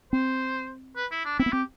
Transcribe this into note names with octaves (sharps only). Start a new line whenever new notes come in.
C4 C5
B4
E4
D4
C4 E4
B3
C4 G4